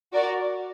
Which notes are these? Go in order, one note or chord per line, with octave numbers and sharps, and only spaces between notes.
F#4 A#4 D5